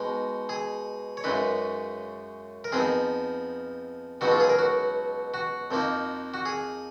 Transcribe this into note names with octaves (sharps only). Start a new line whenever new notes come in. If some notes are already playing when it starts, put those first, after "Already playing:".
Already playing: B2 G#3 D#4
G#4
C#5
F#2 C#3 G#3 D#4 B4
A#4
F2 F3 B3 D#4 G#4
C#2 B2 F#3 B3 D#4 F#4
F4
G#4
A#4
F#4
F#4
F2 F3 A#3 D#4
F#4
G#4